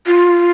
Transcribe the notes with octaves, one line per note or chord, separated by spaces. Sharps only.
F4